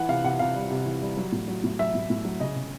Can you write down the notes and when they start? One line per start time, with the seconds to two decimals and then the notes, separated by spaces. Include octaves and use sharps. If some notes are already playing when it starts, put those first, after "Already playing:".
Already playing: E3 F#5
0.09 C3 F5
0.24 C3 F#5
0.39 C3 F5
0.55 G3
0.70 C3
0.86 E3
1.02 G3
1.17 F#3
1.32 A2
1.48 F#3
1.64 A2
1.79 F#3 E5
1.95 A2
2.10 A2
2.25 F#3
2.40 C#3 D#5
2.56 C#3